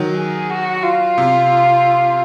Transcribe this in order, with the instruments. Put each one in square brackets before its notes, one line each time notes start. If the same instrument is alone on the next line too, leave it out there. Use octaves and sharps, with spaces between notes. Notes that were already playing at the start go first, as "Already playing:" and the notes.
Already playing: [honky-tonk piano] D#3 F#3
[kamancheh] G#4
F#4
F4
[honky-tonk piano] C3